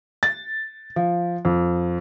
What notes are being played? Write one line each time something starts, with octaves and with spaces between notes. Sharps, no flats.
A6
F3
F2